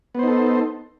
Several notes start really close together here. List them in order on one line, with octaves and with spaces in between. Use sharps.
B3 C5 D#4 A4